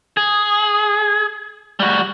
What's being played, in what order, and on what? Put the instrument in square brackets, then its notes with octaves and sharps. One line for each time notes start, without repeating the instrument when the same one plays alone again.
[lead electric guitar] G#4
G3 F#4